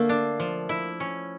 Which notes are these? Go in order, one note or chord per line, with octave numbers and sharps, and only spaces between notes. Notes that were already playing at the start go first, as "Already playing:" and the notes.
Already playing: D3 A3 A#3
D4
F3
E4
C#4